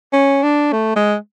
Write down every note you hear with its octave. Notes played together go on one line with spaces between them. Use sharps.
C#4
D4
A3
G#3